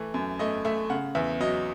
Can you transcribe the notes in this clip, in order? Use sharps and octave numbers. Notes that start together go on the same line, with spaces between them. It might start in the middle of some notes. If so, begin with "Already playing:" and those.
Already playing: E3 A3
F#2
A3 D#5
A3 E5
C#3 F#5
E2 E5
F#3 D#5